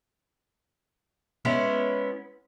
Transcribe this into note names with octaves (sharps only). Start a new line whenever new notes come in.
G#3 B3 C#4 E4